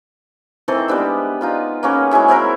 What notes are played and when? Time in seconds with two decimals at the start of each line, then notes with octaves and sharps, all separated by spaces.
0.68 D#3 E3 C4 A4
0.88 G3 G#3 B3 D4
1.41 D#4 F4 B4
1.83 A#3 B3 C#4 G#4
2.11 F#3 G#3 E4 G#4
2.28 C4 E4 A#4 F#5